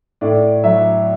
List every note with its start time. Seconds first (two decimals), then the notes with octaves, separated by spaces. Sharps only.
0.21 A2 D5
0.64 F#3 E5